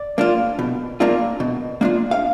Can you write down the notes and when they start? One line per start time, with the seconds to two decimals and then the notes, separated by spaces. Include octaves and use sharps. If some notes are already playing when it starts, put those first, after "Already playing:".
Already playing: D5
0.18 A#3 D4 F4
0.59 B2
1.00 A#3 D4 F4
1.40 B2
1.81 A#3 D4 F4
2.11 F5